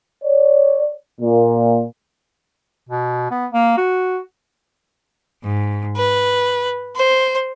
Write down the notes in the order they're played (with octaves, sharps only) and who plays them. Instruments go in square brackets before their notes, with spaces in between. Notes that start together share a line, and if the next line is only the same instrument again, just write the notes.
[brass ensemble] C#5 D5
A#2
[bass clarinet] B2
B3
A#3
F#4
[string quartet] G#2
B4
C5